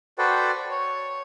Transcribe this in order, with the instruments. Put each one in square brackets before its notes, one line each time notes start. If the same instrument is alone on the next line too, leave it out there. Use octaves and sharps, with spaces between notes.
[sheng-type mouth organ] F#4 A4 B4 C5 D5 G5
C#5